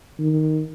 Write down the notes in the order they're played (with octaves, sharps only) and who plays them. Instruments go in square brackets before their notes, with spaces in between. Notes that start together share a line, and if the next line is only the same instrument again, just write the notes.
[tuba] D#3